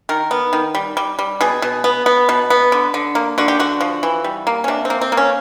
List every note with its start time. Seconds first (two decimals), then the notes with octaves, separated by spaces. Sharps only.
0.09 D#3 A#4
0.31 B3
0.53 D#3
0.75 G3
0.97 G3
1.19 G3
1.41 B2 G#4
1.62 B2
1.84 B3
2.06 B3
2.29 B2
2.50 B3
2.72 D3
2.94 D3
3.15 A#3
3.38 D3 F#4
3.48 G4
3.60 D3 F#4
3.81 F3
4.03 E3
4.24 G3
4.47 A#3
4.64 C#4
4.68 C3 D4
4.85 C4
4.90 A#3
5.01 C4
5.12 A#3
5.17 C#4